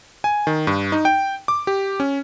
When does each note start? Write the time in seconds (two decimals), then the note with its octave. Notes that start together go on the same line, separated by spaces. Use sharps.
0.24 G#5
0.47 D#3
0.67 G2
0.92 D#4
1.05 G5
1.48 D6
1.67 G4
2.00 C#4